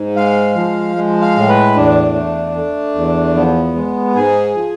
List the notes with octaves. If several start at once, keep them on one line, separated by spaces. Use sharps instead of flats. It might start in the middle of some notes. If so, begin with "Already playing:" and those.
Already playing: G#2
G#3 F5
F3
G#3
F5
A2
B4
E2 D4
A3
A3
E2
F3 B3
G#3
G#2 G#4
F3